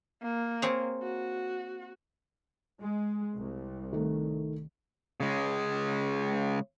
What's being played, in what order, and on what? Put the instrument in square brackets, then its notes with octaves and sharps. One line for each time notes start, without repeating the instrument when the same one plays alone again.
[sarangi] A#3
[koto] C4 G#4 C#5
[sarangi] F#4
[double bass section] G#3
C2
[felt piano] D#3 A3
[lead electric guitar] C#3 G#3